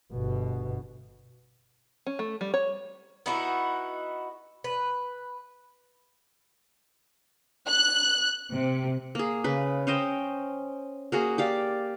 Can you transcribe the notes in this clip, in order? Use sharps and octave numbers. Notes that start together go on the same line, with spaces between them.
G1 B2
C#4
A3
G3
C#5
B3 D#4 E4 F#4
B4
F#6
C3
A#3 G#4
C#3 B4
C#4 C5 D#5 G5
A#3 F#4 G#4
G4 D5 F5